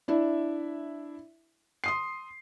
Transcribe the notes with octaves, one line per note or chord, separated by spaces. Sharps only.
D4 E4 E5
C6 D#6 C7